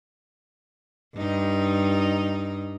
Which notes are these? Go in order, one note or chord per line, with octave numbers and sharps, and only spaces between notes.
G2 D#4